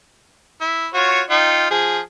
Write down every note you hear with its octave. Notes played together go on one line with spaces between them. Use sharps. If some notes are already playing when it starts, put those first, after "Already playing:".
E4
F4 F#4 C#5
D#4 F4 G5
F3 G#4